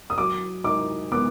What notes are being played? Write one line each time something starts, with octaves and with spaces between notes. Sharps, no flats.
D#6
F#3 D6
D#4 D6
B3 D6